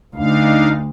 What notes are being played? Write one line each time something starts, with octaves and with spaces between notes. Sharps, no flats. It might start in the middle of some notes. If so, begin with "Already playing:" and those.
D2 D4 D#4 F5